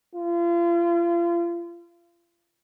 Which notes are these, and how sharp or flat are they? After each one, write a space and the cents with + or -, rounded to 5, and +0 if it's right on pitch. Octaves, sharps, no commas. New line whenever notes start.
F4 -35